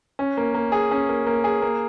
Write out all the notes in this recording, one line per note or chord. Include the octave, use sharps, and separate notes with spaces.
C#4
A#3
A#3
G#4
C#4
A#3
A#3
G#4
A#3